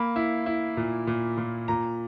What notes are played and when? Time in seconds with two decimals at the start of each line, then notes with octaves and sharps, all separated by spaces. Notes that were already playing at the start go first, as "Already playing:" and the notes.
Already playing: A#3 B5
0.16 E4
0.46 E4
0.77 A#2
1.07 A#2
1.37 A#2
1.68 A#2 A#5